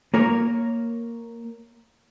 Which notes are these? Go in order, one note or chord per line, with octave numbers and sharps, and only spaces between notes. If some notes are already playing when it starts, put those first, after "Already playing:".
A#3 A#4 C#5